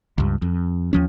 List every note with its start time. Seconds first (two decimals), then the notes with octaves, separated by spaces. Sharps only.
0.18 C#2 G2
0.42 F2
0.93 D#2 F3 C#4